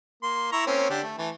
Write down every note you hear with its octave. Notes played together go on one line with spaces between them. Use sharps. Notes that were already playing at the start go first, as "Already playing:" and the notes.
A#3 C6
E4 A#5 C#6
A#3 C4 C#4
D3 D4 G4
A3
E3 A3